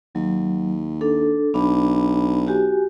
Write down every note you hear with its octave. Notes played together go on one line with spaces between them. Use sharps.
D#2 F#3
D4 A4
B1 D4 B5
F#4 G4 G#5